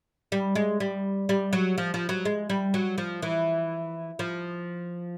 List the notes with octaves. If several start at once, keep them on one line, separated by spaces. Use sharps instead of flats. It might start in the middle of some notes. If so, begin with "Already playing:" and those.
G3
G#3
G3
G3
F#3
F3
F3
F#3
G#3
G3
F#3
F3
E3
F3